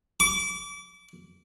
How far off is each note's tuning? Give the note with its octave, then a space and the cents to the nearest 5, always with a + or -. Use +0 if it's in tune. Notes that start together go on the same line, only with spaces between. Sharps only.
D6 -30